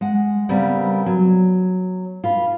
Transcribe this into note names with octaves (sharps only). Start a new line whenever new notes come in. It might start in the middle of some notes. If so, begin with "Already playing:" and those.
G#3 F#5
C#3 G3 B3 C4 A#4
F#3
F4 B4